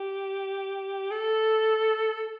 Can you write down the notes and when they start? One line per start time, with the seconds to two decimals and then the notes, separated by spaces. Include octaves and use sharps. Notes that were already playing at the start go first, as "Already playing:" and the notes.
Already playing: G4
1.11 A4